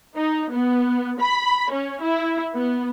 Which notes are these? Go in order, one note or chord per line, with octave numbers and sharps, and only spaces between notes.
D#4
B3
B5
C#4
E4
B3